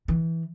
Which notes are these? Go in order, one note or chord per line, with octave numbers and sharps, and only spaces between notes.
E3